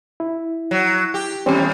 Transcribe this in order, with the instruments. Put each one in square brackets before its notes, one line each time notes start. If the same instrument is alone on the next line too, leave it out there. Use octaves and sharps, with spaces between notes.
[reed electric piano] E4
[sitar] F#3
G4
[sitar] D#2 G3 [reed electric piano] C4 C#4 G4